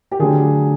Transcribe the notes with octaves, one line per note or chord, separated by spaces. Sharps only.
G4
D3 F#3 A3 G#4